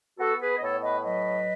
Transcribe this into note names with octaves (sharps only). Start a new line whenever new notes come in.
B3 F#4 A4
G#4 B4
D#5
A2 A4 C#5
B4 D#5
F#3 B4 D#5